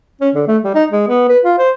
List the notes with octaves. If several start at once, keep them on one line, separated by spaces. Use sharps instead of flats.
C#4
D3
A3
G3
D#4
G#3
B3
B4
F4
C5